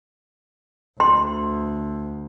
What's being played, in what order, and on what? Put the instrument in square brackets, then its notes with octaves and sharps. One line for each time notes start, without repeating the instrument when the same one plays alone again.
[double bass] D2 [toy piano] C6